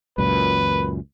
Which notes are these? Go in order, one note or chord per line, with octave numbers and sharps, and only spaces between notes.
C#2 F#2 A#2 B4